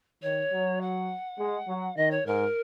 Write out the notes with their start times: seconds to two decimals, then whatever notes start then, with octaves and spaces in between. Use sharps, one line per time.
0.22 D#3 C#5
0.52 F#3
0.81 F#5
1.39 G#3
1.68 F#3
1.96 D#3 D#5
2.11 C#5
2.26 G#2 A#4